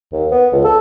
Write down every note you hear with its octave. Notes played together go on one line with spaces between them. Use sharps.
D#2
B3
C#2
A4